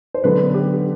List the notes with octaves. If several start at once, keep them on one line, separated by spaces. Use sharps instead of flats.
C5
D3 F#3 B3 D4 B4
G4